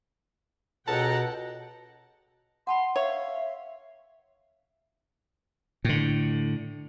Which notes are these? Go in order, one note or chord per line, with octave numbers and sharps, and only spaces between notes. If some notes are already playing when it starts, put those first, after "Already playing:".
C#2 B2 A4 F#5 G5 A5 A#5
F#5 A5 B5 C6
C#5 E5 F5
A2 D3